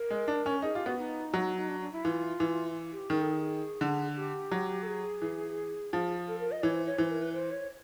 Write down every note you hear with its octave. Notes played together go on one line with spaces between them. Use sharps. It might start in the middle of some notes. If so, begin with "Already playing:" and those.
Already playing: A#4
G#3
D4
C#4
D#4 G#4
F4 G4
B3 F#4
D#4
F#3
D#4
D4
D4
E4
E3 F4
E3
G4
D#3 G#4
A4
G#4
D3
G4
F#3
A4
G#4
E3
F3
A4
A#4
D#5
E3 C#5
C5
C#5
E3 C5
A#4
B4
C5
C#5